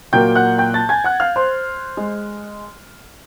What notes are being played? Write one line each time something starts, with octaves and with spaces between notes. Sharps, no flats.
A#2 F#3 A#3 G5 G6
F#5 F#6
G5 G6
A5 A6
G#5 G#6
F#5 F#6
F5 F6
C5 C6
G#3